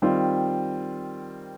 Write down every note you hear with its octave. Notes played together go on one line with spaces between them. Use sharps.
D#3 G3 C4 F4